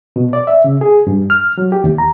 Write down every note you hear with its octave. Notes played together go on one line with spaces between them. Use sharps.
B2
D5
E5
C#3
G#4
G2
F6
F#3
G4
D#2
A#5